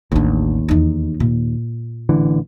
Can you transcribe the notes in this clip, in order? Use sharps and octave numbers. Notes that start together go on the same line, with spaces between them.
A1 D#2 D3
E2 D#4
A#2
A1 D3 E3